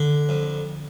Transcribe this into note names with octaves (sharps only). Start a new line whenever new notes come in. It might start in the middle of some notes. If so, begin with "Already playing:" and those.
Already playing: D3
F2